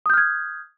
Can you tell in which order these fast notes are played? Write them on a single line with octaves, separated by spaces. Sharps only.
D#6 G6 F6 G#6